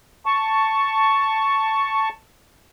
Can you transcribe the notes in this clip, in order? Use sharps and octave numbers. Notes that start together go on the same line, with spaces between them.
A5 C#6